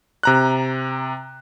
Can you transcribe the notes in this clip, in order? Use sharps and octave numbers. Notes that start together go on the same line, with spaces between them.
C3 A#5 F#6